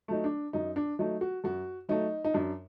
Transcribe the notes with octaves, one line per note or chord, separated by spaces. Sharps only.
F#3 A3 D#4
D4
F#2 D#4
D4
F#3 A3 D#4
F#4
F#2 F#4
F#3 A3 D#4
D#4
F#2 D4